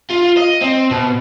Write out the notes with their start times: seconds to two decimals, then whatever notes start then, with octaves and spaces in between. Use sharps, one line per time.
0.10 F4
0.37 D#5
0.61 C4
0.91 B2